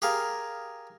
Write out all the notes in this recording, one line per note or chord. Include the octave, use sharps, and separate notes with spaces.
G4 G#4 A#4 F5